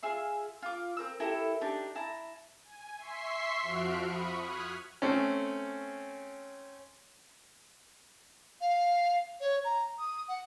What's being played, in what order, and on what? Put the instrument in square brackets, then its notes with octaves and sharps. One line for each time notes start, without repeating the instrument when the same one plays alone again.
[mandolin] F4 G#4 E5 C6
F4 D6
C4 A#4 E6
E4 G4 A4 A#4
D4 D#4 G4
E4 A5 A#5
[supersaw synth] G#5
E5 C6 C#6 B6 C7
F2 F3 F#4 F6 F#6 D7
B5 C#6 D#6
D#6 F6 F#6 G#6 B6 C#7
[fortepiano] A3 C4 C#4
[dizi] F5
C#5
A#5
D#6
F#5